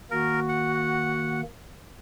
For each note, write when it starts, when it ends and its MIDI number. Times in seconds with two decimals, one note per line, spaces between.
0.11 1.42 51
0.11 1.42 58
0.11 1.39 66
0.11 0.40 70
0.49 1.41 78